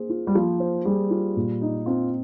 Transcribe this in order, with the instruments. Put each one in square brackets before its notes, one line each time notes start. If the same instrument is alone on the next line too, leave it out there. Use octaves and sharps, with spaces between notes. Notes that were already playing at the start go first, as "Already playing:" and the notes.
Already playing: [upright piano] A#3 G#4 C5
F4
[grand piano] G3
[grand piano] F3 [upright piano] A#3
[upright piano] C5
[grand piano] G3 [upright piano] G#4
[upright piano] F4
A#2
D#4
[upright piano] C4 [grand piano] F4